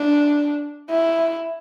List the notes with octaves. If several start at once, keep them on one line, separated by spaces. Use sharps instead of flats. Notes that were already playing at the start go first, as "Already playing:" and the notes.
Already playing: D4
E4